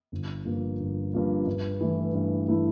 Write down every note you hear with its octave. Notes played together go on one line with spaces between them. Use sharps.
G1
G2 F3 A#3
G1
G2 F3 A#3
G2
E3 A3 E4
G2
E3 A3 E4